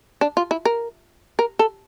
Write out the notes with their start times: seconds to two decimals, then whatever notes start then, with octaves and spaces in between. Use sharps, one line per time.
0.21 D4
0.37 F4
0.51 E4
0.65 A#4
1.39 A#4
1.59 A4